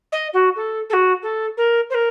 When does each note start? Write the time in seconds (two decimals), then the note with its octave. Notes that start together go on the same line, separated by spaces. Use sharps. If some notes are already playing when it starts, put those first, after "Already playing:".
0.12 D#5
0.34 F#4
0.56 A4
0.90 A4
0.93 F#4
1.23 A4
1.57 A#4
1.90 C5
1.94 A#4